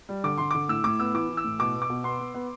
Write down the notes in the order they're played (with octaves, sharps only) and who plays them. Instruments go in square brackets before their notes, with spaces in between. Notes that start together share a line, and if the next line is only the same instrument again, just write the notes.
[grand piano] G3
D3 D6
D3 C6
D3 D6
A2 E6
A2 D6
B3 E6
E3 D6
E3
E6
A2
B2 D6
B3
D6
B2
B3 C6
B3
B3